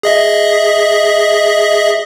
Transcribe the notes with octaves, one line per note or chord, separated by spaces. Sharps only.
G#4 D#5 E5